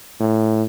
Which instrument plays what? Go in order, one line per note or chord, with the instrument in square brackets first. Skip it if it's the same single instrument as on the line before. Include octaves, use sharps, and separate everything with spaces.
[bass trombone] A2